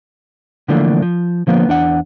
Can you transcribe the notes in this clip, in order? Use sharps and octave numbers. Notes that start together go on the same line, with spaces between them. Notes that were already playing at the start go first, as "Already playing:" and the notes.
D3 E3 F3 A3 A#3 D4
F3
D3 F3 A#3 B3
E2 D4 D5 F#5